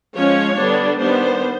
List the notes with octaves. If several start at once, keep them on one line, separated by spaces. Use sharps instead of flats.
F3 G#3 C#4 C#5
D3 G3 B3 D4
D#3 G3 B3 D4 C5